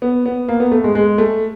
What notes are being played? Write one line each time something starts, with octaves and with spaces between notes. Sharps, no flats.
B3
B3
A#3
B3
A3
G#3
G#3
A3